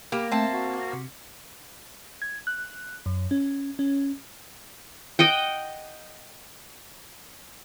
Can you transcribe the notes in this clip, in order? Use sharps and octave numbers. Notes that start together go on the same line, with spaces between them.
A#3 G4
A3 C4 C5 E5 G5 A5
F#4
C3
G#6
F#6
F#2
C#4
C#4
D#5 F#5 G5